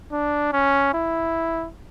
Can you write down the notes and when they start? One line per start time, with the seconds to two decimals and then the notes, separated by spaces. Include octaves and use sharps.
0.12 D4
0.53 C#4
0.94 E4